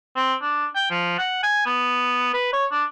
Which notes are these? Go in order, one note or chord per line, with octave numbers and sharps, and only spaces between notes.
C4
D4
G5
F3
F#5
G#5
B3
B4
C#5
D4